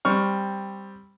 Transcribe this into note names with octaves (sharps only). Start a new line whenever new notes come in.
G3 C4 C#6 F6